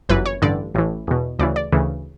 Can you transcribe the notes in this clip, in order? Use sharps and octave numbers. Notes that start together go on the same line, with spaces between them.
G1 F#2 E3 B4
C#5
A1 G2 D3 D5
A1 A2 E3
E2 B2
D2 C#3 E3 D5
D5
D2 C#3 E3